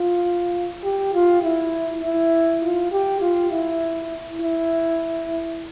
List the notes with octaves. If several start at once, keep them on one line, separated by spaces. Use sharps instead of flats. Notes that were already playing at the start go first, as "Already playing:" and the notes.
Already playing: F4
G4
F4
E4
E4
F4
G4
F4
E4
E4